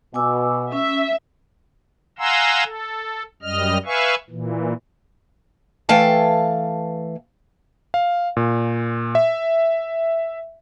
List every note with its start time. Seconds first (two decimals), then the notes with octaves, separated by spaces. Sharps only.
0.14 B2 G#5 D6 E6
0.72 C#4 E5
2.19 F5 F#5 G#5 A#5 C6 E6
2.65 A4
3.43 F#2 G3 D#5 F6
3.85 B4 E5 F5 G#5 C#6
4.30 A#2 E3
5.89 E3 A3 F5 G5 A5
7.94 F5
8.37 A#2
9.15 E5